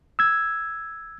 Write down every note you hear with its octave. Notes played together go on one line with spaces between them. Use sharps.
E6 G#6